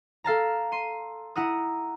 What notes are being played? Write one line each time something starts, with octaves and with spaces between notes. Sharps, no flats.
A4 F5 A5 A#5
C6 D#7
E4 F#5 A#5 D#6